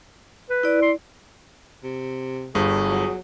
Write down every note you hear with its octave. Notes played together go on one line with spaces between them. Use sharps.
B4
E4 D5
C6
C3
G1 G2 G#4
F#3